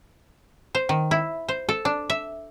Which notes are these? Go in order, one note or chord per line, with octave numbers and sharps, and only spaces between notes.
C5
D#3
E4
C5
A4
D4
E5